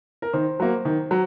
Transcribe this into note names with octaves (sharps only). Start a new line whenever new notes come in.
A#4
D#3 C5
F#3 A#3
D#3
F#3